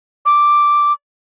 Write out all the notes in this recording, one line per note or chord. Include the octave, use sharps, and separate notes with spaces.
D6